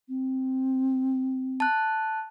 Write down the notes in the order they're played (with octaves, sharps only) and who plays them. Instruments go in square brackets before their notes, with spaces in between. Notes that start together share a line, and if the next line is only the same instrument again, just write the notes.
[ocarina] C4
[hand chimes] A5 F#6